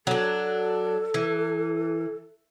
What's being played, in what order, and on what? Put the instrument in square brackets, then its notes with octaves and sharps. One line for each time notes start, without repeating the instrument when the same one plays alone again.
[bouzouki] F#3 D4 [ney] A4
[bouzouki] E3